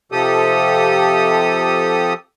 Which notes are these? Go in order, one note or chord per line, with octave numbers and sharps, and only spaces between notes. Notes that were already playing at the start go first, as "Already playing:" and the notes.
C3 F3 G4 A4 D#6